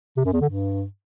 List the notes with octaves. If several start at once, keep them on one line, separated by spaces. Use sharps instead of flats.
C3
F#2
E2
D3
G2